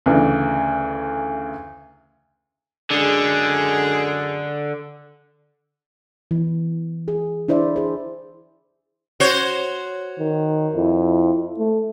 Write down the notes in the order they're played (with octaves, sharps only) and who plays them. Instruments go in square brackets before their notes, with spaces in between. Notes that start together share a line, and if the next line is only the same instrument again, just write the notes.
[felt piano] D2 C#3 E3
[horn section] F#2 G#3 G#4 [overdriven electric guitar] D3
[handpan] E3
G#4
D4 E4 C5 D5 E5
G#4 C5
[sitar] F#4 C5 C#5
[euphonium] D#3
[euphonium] F2 [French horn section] E4
[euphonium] A3